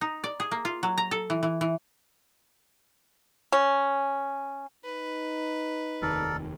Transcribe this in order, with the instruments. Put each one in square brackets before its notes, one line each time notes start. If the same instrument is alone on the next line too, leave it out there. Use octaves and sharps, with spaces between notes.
[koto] D#4
D5
G#4
A#3
F4
F#3
A#5
A4
E3
E3
E3
[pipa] C#4
[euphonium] D#4 [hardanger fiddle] B4
[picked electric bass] F1 D#2 D#3 [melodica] A4 A#4 D5